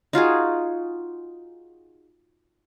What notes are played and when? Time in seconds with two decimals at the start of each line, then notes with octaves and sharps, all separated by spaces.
0.13 D#4 F4 F#4 G#4